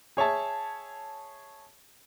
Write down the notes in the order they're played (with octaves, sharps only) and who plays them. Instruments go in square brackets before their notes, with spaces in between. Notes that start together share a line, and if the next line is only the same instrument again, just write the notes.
[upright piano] G#4 C#5 E5 A5